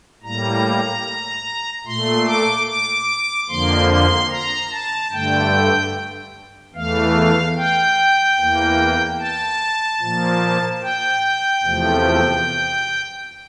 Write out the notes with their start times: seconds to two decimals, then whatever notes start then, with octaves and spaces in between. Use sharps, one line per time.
0.23 A2 G3 A#3 A#5
1.86 A#2 A3 C6
2.27 D6
2.67 D6
3.49 F2 D3 F3 A#3 C6
3.90 C6
4.31 A#5
4.71 A5
5.12 G2 D3 A3 G5
6.75 E2 E3 A3 F5
7.56 G5
8.38 E2 E3 A#3
9.19 A5
10.01 A#2 F3 A#3
10.82 G5
11.63 E2 C3 F3 A3